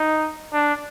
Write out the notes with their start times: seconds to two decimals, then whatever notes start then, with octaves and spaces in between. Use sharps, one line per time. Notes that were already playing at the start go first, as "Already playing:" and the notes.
Already playing: D#4
0.53 D4